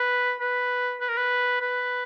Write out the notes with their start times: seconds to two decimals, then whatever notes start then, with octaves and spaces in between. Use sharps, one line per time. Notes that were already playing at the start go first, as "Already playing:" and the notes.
Already playing: B4
0.40 B4
1.01 B4
1.09 A#4
1.18 B4
1.61 B4